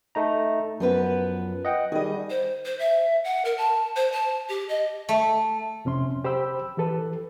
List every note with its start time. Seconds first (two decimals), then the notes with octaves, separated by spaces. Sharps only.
0.15 A3 D#4 A#5
0.80 F#2 F3 B3 B4
1.65 D#5 F#5 G5
1.92 D#3 G3 G#4 D#5
2.30 C5
2.65 C5
2.79 E5
3.24 F#5
3.45 A#4
3.58 A5
3.96 C5
4.12 A5
4.49 G4
4.69 D#5
5.09 A3
5.85 F2 C3 C#4 C6
6.24 G4 C5 G5 B5 E6
6.77 E3 G4 A4 B4